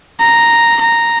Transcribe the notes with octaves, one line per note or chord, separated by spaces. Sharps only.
A#5
A#5